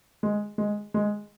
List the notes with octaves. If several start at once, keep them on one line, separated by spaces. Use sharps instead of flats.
G#3
G#3
G#3